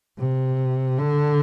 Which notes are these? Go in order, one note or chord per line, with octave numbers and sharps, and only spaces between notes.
C3
D3